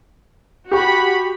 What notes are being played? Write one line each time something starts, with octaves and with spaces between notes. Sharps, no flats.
F#4 G4 B5 C#6